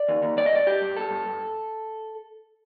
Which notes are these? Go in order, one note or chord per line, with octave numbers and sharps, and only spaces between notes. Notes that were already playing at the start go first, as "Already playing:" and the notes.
Already playing: D5
D#2
D#2
G2 D5
D#5
G2 D5
G2 G4
G2
G2 A4
G2
G2